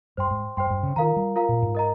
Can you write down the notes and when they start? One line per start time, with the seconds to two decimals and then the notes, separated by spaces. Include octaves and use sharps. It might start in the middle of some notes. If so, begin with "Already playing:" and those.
0.17 G2 C5 G5 C6
0.31 G#2
0.57 G2 C5 G5 C6
0.70 G2
0.83 C#3
0.96 D#3 F4 A#4 F5 A#5
1.16 G3
1.36 F4 A#4 F5 A#5
1.49 A#2
1.62 G#2
1.75 A#4 D#5 A#5